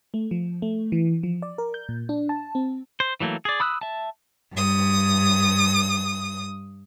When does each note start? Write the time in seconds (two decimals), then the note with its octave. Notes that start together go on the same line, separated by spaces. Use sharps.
0.14 A3
0.31 F3
0.62 A3
0.92 E3
1.23 F3
1.42 D5
1.58 A#4
1.74 G6
1.89 A#2
2.09 D4
2.29 A5
2.55 C4
3.00 C5
3.20 E3 F#3 A3 A#3
3.45 G#4 D5
3.60 B5 D#6 E6 F#6
3.81 E5 A5
4.53 G2 D#6